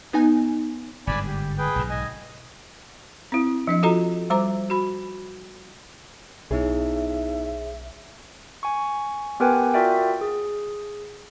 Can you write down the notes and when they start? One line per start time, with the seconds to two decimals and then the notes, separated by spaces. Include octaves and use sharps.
0.13 B3 D#4 G#5
1.07 G1 G#2 D3 D5 G#5 B5
1.27 G4
1.58 G#4 B4 G5
1.76 B1 G#2
1.90 D#5 G#5
3.32 C4 E4
3.67 F3 D4 D#5
3.83 F4 F#4 A4 D#5 A#5
4.30 G3 C5 A#5 D6
4.70 F#4 B5
6.51 B1 B3 D#4 E4 G#4 C#5 E5
8.63 G#5 C#6
9.40 B3 G4 A#4 B4 G5 G#5
9.74 F4 F#4 A#4 D5 E5 G5
10.21 G#4